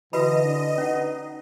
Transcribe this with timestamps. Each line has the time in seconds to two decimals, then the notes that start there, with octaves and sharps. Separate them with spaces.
0.13 D3 E3 F#4 B4 D#5 B5
0.44 D4
0.78 C#4 D#4 B4 F#5